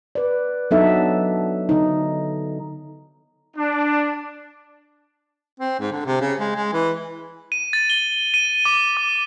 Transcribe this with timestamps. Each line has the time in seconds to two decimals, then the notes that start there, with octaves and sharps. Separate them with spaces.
0.15 B4 D5
0.71 F#3 B3 D4 D#4 A4 E5
1.69 D3 D#4
3.57 D4
5.60 C4
5.80 G#2
5.92 D3
6.06 C3
6.21 C#3
6.40 G#3
6.56 G#3
6.73 E3
7.52 D#7
7.73 A6
7.90 G7
8.34 D#7
8.65 D6
8.97 D6